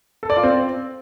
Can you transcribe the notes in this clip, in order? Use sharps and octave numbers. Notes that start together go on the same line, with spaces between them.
A4
D5
F4
C4